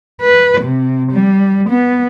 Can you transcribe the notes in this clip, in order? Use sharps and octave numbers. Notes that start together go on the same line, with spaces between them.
B4
C3
G3
B3